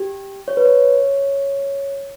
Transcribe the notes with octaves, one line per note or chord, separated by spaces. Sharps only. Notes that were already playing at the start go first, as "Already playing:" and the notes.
Already playing: G4
C#5
B4
C#5